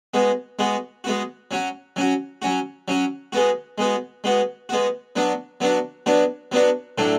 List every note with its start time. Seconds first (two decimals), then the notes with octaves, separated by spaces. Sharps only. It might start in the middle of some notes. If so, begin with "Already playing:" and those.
0.14 G#3 B3 F#4
0.59 G#3 B3 F#4
1.04 G#3 B3 F#4
1.51 F#3 C#4 F#4
1.96 F#3 C#4 F#4
2.42 F#3 C#4 F#4
2.88 F#3 C#4 F#4
3.32 G#3 B3 F#4
3.78 G#3 B3 F#4
4.24 G#3 B3 F#4
4.69 G#3 B3 F#4
5.16 F#3 B3 D4 F#4
5.60 F#3 B3 D4 F#4
6.06 F#3 B3 D4 F#4
6.52 F#3 B3 D4 F#4
6.98 A2 F#3 A3 D4